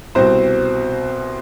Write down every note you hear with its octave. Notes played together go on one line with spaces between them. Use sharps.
C2 B2 C4 C5